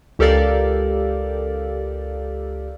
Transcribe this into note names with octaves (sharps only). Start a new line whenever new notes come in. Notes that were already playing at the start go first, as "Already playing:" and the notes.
C#2 G4 A4 A#4 D5 F5